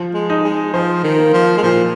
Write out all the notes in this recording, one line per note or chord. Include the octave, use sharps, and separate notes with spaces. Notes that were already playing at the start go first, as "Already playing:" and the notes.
Already playing: F3
G#3
D#4
G#3
F3 C5
D#3
A#3
F3
G#3
A#2 F3